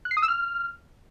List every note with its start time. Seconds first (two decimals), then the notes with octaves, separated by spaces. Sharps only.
0.05 F#6
0.11 C7
0.17 D#6
0.22 E6
0.28 F6